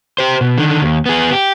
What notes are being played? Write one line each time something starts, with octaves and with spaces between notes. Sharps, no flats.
G4 C5
B2
D3 D#3
D#2
B3 G#4
G4